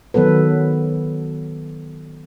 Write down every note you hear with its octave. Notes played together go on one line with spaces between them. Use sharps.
D#3 F#3 B3 A4 B4